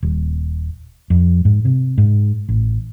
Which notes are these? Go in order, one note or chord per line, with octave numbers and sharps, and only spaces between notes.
D#1
F2
G#2
C3
G#2
A1